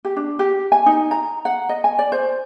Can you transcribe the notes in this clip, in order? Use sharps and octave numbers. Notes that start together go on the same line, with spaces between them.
G4
D4
G4
G#5
D#4
A#5
F#5
D#5
G#5
D5
C5